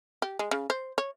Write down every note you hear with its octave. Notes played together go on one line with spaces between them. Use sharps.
G4
G#3
C#3
C5
C#5